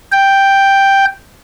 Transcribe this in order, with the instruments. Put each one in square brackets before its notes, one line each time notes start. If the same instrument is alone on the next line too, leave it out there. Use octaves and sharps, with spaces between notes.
[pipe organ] G5